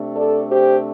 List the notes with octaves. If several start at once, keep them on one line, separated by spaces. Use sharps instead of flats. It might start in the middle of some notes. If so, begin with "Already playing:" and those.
Already playing: C3 A3 D4
A4 D5
G4 C5